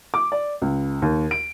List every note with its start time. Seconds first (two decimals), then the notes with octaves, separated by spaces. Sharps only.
0.14 D6
0.32 D5
0.62 C#2
1.02 D#2
1.31 D7